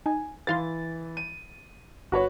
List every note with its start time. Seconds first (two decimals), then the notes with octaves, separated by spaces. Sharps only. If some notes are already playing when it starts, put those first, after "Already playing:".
0.06 D#4 G#5
0.47 E3 B4 F5 C6 A6
1.17 D#7
2.12 G1 F#4 B4 C#5